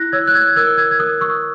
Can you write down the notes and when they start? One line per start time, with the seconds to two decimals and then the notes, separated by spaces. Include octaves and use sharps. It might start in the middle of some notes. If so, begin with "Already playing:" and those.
Already playing: E4 F#6 A#6
0.12 C#5 E6 G#6
0.27 F#6
0.34 E6 G#6
0.56 A#4 E6 G#6
0.77 E6 G#6
0.91 G#6
0.99 A#4 D#6 F#6
1.21 C#6 E6